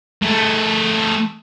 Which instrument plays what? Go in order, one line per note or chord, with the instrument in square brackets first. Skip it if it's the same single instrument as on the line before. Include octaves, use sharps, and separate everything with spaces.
[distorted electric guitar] A3 G#4